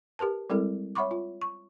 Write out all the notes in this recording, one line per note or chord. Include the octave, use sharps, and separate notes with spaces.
G4 A#4 B4 A5
G3 G#3 C4 E4 A4 A#4
C#5 E5 F#5 B5 C#6 D6
F4
C#6